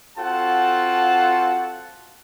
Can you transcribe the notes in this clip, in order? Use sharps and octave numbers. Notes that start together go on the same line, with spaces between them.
C4 F4 F#4 A4 F#5 A5